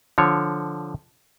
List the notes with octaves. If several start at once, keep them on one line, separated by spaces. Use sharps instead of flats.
D3 F3 C#5